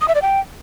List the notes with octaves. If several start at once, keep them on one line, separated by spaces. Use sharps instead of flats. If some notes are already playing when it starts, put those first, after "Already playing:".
D#6
E5
D5
G5